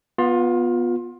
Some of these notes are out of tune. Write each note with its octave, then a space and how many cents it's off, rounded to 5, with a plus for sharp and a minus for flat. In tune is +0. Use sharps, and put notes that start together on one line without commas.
B3 -10 F4 +20